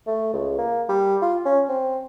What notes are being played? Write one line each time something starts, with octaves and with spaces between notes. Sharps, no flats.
A3
C#2
A#3
G3
F4
C#4
C4